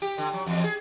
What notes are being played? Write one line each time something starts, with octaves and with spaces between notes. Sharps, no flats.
G4
D3
F#3
E2
G#4